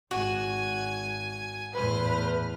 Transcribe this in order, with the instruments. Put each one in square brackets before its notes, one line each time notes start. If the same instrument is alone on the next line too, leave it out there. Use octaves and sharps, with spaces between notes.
[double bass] G#1 [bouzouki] F#4 [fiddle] G#5
[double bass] E2 A2 [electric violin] B4 [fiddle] C5 F6